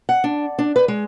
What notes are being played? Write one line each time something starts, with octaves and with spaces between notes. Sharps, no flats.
F#5
D4
D4
B4
G#3